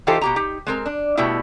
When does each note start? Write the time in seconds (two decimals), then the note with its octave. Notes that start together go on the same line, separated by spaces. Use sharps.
0.07 E3 D#4 F4 G4 A4 C5
0.21 B2 G4 A#5
0.36 D#4 G4
0.67 G#3 C4 A#4
0.86 D4
1.17 B2 G3 A3 E4